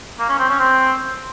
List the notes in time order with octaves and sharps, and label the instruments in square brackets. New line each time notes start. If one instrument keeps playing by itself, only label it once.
[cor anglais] A#3
C#4
C4
C#4
C4